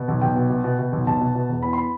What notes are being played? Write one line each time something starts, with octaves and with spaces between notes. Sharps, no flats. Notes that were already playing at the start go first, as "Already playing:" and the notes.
Already playing: B2
B1
B1 G5
B2
B2
B2
B2
B1
B1 A5
B2
B2
E1
E2 B5
C6
B5